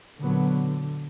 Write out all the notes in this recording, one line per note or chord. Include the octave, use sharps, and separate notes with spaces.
A#2 D3 F#3 B3